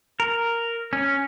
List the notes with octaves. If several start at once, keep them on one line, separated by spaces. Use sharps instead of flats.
A#4
C#4